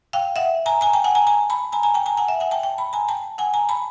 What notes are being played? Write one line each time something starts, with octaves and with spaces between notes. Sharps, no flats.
F5 G5
E5 F#5
G#5 A#5
G#5 A#5
G5 A5
F#5 G#5
G#5 A#5
G#5 A#5
A5 B5
G#5 A#5
G#5 A#5
G5 A5
G#5 A#5
F#5 G#5
E5 F#5
F#5 G#5
G5 A5
G5 A5
A5 B5
G#5 A#5
G5 A5
F#5 G#5
G#5 A#5
A5 B5